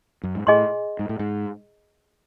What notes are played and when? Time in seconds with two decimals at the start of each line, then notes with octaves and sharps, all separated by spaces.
0.23 F#2
0.35 G#2
0.47 A2 G#4 D#5 G#5 C6
0.99 G#2
1.09 A2
1.19 G#2